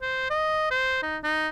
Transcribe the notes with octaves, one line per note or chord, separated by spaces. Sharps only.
C5
D#5
C5
D#4
D#4